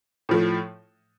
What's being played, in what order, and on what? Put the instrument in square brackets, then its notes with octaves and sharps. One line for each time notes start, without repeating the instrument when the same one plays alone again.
[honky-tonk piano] A2 F3 A3